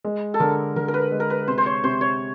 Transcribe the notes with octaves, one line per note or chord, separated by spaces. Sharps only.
G#3
A4
D3 A#4
D3 A#4
A#4
B4
G#3
A#4
B4
C3 C5
C5
C#5
C3 C5
C#5